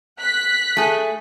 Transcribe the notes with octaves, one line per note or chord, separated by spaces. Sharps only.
F#6 B6
A3 G#4